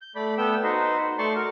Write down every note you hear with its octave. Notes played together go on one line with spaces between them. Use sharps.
G6
A3 D5 B5
A3 B3 G5 E6
D#4 F#4 B4 C5 D#5
A3 D5 A5 C6 C#6
F#4 A#4 C#6